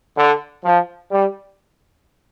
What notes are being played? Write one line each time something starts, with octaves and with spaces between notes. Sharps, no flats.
D3
F3
G3